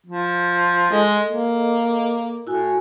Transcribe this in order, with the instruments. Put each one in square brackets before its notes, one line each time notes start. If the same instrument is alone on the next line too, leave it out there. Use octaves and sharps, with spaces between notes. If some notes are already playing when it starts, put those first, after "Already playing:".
[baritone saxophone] F3
[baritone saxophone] G#3 [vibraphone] A4 D#5
[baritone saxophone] A#3
[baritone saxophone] A2 [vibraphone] E4 F#4 G#5